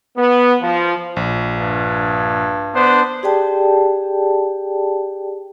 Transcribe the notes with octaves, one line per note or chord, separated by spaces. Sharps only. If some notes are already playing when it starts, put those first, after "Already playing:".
B3
F3
A#1
G2
B3 D4 C5
G4 G#4 D5 G5 A5